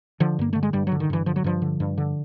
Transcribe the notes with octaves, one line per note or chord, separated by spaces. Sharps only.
D3 F3
G2 A#3
D3 A3
G#3
G2 G3
F#3
D3
D#3
G2 E3
D3 F3
F#3
G2 F3
D3
G2
D3